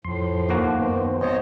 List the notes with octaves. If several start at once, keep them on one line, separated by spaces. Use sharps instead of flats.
F2 A2 F3 C6
D#2 A#3 F#4
F#2 D#3 B3 C5
G#1 C5 C#5 D#5